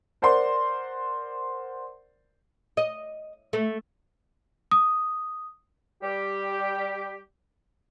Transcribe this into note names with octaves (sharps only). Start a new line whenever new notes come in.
A#4 C5 D5 F#5 C6
D#5
A3
D#6
G3 G4